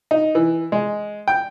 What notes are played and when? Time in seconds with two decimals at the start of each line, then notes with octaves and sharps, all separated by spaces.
0.11 D#4
0.35 E3
0.72 G#3
1.28 G5